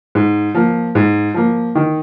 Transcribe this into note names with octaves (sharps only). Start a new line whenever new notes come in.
G#2
F3 A#3
G#2
F3 A#3
D#3